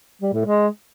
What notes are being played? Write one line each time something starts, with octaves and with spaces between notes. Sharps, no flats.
G3
A2
G#3